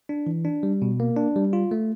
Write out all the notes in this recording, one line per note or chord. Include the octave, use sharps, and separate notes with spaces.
D4
E3
D4
G3
B2
A#3
D4
G3
F4
A3